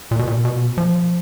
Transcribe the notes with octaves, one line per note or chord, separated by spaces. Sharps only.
A#2
B2
A#2
B2
F3